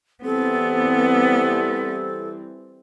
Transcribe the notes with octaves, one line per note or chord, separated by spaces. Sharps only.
E3 G3 B3 C4 A4